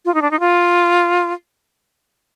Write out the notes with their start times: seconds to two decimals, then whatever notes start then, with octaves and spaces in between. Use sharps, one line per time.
0.05 F4
0.14 D#4
0.22 D4
0.31 D#4
0.40 F4